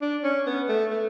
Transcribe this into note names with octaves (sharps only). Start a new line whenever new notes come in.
D4
C#4
B3
A3
A3